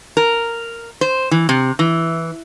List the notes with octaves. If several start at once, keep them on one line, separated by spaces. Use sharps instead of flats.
A#4
C5
E3
C3
E3